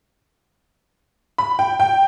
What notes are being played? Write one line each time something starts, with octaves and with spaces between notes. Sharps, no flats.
B5
G5
G5